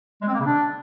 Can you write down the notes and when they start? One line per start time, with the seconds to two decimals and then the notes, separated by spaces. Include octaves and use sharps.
0.22 G#3
0.28 C4
0.34 A#3
0.40 C#3
0.46 D4